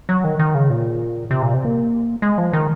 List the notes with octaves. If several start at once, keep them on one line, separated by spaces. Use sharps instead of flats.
F#3
D#3
D#3
C#3
A#2
C3
A#2
C3
A#3
G#3
F3
D#3